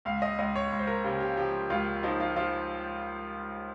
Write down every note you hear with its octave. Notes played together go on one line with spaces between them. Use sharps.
C#2 F5
D#5
C#2 D#5
C#5
C#2
C5
A#4
C#3 G4
G4
F3 G4
C#2 F4
F3 D#4
F4
F3 F4